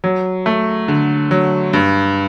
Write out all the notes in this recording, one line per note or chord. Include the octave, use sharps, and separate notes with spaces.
F#3
A3
D3
F#3
G2